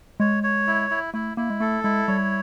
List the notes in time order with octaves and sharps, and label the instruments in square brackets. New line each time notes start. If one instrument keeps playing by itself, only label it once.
[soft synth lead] G#3 [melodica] C#5
[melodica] C#5
E4
E4
[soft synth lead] A3 [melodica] E4
[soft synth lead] A#3 [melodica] E4
[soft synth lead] G#3
[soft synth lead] A3 [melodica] A4
[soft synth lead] G#3 [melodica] E4
[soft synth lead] G3 [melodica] C#5